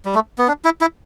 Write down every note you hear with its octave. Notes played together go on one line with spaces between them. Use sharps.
G3
A3
B3
D4
E4
E4